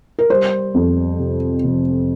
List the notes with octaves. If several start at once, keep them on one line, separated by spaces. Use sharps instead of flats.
A#4
G3 C5
F2
C3
F1